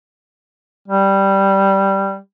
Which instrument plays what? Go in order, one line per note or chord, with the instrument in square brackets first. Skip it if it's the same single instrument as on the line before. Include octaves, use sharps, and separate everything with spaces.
[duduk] G3